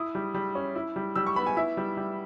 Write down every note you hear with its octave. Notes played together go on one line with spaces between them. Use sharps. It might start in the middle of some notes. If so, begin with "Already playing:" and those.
Already playing: E4 D#6
G3
G3
C#4
E4
G3
G3 E6
C#6
B3 B5
G#5
E4 E5
G3
G3